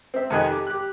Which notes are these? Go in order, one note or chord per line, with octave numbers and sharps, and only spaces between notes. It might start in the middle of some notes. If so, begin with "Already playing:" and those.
C4 E5
F2 C3 D#3 D#5 G#5 F#6
G4 A4
G4 F#6